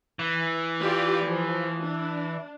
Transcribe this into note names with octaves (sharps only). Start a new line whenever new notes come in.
E3
F4 G4 D5
F3
D4